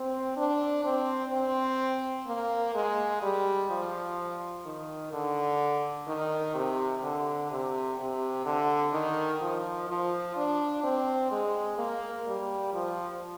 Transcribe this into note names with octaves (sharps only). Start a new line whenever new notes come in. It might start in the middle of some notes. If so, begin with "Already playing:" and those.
Already playing: C4
D4
C4
C4
A#3
G#3
G3
F3
D#3
D3
D#3
C3
D3
C3
C3
D3
D#3
F3
F3
D4
C4
G#3
A#3
G3
F3